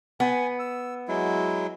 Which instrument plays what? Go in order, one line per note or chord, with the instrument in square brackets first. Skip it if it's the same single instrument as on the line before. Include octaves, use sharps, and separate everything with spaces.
[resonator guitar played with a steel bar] B3 [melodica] G#5
[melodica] E6
F#3 G#3 E4